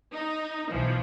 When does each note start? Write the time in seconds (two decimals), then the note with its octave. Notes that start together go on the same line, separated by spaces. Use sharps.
0.14 D#4
0.71 B1 E3 F3